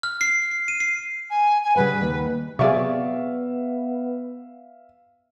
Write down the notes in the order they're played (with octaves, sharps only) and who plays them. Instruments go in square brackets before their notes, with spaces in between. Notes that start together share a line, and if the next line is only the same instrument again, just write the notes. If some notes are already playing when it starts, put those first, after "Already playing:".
[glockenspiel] F6
C7
C7
D#7
C7
[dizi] G#5
G#5
[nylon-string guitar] C#3 G3 F#5 [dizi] B4
[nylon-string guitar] D#2
[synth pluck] C3 F#3 [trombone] B3 [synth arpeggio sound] G#4 D5 C#6 [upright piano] E5 F5